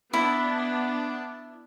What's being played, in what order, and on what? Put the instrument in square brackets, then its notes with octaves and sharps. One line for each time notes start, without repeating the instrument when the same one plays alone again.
[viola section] B3 D4 [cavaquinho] E4